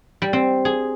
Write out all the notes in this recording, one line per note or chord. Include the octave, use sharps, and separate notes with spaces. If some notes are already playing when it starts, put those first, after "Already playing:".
G3
C4
G#4